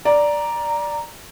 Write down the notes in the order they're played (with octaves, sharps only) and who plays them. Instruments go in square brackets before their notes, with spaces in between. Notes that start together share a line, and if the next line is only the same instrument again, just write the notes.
[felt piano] D5 [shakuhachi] A#5